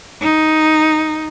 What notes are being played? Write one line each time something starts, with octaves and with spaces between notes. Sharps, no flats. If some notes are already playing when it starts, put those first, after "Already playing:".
D#4